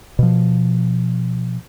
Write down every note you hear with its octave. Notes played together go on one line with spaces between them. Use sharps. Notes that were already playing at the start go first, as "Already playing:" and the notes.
B2 F3